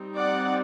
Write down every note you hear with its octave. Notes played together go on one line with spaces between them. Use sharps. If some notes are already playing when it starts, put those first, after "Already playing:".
Already playing: G3 C4 D#4
D5 F#5